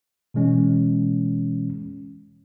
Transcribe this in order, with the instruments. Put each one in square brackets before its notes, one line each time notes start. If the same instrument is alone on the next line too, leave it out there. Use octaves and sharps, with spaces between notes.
[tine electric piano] B2 E3 G#3 C#4